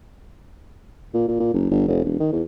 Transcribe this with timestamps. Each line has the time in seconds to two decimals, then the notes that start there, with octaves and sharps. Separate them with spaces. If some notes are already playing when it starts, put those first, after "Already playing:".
1.14 A#2
1.28 A#2
1.40 A#2
1.54 F#1
1.71 G1
1.88 F1
2.04 E1
2.20 D#3
2.32 E2